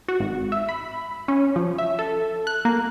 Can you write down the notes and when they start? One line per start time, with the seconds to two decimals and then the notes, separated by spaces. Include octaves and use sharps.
0.08 F#4
0.20 G#1
0.52 E5
0.69 B5
1.28 C#4
1.56 F3
1.78 E5
1.99 A4
2.47 F#6
2.65 A#3